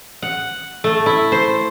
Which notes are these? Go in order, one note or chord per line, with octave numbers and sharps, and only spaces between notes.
F#5
A3
E4
C5